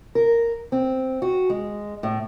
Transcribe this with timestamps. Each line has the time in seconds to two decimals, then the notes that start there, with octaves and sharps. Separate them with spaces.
0.15 A#4
0.72 C4
1.22 F#4
1.50 G#3
2.03 A2